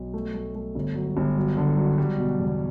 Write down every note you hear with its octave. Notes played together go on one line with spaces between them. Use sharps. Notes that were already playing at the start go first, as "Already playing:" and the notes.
Already playing: B1
A3
A3
A3
G1
F#3
G1
F#3
D3
F#3
G3
B2
E2